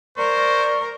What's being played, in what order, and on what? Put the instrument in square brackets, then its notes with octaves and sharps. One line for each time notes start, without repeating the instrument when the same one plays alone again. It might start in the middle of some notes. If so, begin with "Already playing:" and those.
[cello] A#4 [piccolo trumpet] C5 [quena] D5 [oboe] C#6